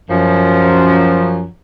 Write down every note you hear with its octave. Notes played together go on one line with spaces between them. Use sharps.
F#2 F3